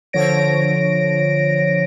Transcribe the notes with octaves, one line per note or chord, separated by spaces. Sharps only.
D3 F3 C#5 A#6 D7